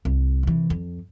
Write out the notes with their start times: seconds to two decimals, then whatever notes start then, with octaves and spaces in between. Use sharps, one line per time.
0.05 C2
0.43 C3 E3
0.70 F2